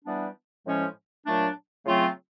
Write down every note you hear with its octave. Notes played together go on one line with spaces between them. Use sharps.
E3 G3 B3 D4
A2 F3 G#3 C#4
A#2 F#3 A3 D4
C#3 F#3 A3 C4 F4